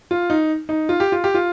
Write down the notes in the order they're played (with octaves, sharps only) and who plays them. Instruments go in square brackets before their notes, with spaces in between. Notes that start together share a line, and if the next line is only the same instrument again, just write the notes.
[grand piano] F4
D#4
D#4
F4
G4
F4
G4
F4